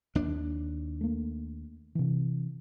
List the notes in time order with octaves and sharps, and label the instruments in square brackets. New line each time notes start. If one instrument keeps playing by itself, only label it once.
[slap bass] D#2 D4
[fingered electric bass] A3 A#3
C3 E3